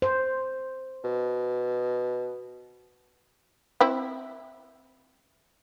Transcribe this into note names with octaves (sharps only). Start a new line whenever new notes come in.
C5
B2
C4 E4 G5